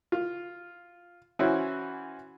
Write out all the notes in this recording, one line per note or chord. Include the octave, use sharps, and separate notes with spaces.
F4
E3 C#4 E4 F#4 C5